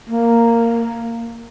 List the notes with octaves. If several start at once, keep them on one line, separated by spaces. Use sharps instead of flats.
A#3